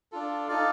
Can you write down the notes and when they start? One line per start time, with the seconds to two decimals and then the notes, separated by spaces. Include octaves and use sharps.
0.12 D4 F4 A4
0.48 D#4 A4 D5 F5